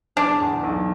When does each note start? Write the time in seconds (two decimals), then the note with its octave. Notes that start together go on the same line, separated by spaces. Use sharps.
0.16 E1 D4
0.41 E2
0.63 B1